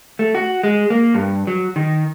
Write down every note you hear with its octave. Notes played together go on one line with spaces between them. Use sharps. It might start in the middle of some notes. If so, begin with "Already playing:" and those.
A3
F#4
G#3
A#3
G2
F#3
D#3